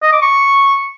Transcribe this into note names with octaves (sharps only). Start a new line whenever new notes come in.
D#5
D6
C#6